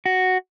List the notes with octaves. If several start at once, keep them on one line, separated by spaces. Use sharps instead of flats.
F#4